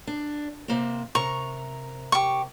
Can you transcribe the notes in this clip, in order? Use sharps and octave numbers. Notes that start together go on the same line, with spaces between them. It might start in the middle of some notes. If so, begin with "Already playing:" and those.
D4
C3 A#3 C4
C3 A#4 A#5 C#6
G4 C#6